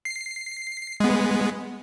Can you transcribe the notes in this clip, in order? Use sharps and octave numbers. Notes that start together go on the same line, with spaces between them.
C7
G#3 B3